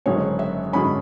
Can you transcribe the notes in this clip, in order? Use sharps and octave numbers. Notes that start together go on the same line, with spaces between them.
F#1 F#2 D3 G#3 C#4 C#5
E5
F#2 D3 G#3 C#4 B5